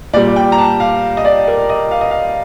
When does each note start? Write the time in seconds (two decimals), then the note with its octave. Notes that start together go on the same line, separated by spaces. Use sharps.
0.13 A#2 D5
0.16 G3
0.36 G5
0.52 A#5
0.58 A5
0.80 F5
1.17 D#5
1.25 D5
1.48 A#4
1.70 D#5
1.91 F5
2.01 D#5
2.11 F5